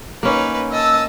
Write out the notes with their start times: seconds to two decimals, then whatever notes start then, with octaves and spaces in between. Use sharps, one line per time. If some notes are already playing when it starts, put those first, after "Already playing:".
0.23 A#3 C#4 D#4 B4
0.72 D#5 A5 E6